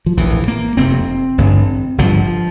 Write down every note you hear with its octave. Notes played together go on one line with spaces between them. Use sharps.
F3
A#1 A2 E3
A#3
F1 F2 C3 C4
A1 G2 D3
G1 G2 D3 F3